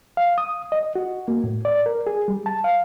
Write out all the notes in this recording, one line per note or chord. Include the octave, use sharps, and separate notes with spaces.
F5
D#6
D#5
F#4
A#3
A2
D5
A#4
G#4
G3
A5
F5